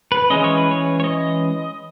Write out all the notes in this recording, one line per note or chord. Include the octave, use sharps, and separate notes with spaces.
B4
E3 G#3 C#4 D#5
C#5
B4
C#5
C#5
D#5